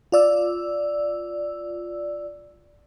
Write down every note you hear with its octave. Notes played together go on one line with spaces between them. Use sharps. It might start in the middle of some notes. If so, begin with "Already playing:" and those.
F4 D5 E6